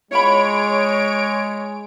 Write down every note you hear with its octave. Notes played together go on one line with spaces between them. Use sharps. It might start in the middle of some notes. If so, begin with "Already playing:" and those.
G#3 E4 F4 C#5 B5 D7